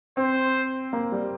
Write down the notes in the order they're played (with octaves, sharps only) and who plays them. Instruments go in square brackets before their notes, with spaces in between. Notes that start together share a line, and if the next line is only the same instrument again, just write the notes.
[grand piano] C4 [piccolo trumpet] C5
[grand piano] A#3
G3